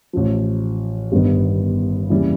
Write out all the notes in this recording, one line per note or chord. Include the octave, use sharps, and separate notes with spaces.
A1 A2 F3
G1 G2 D#3 G3 B3
F1 D#2 C#3 E3 G3